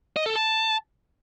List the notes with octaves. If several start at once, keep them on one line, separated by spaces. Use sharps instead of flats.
D#5
A4
A5